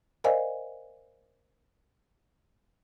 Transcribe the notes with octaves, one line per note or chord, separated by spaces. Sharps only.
A#4 C5 D5 D#5 F5 G#5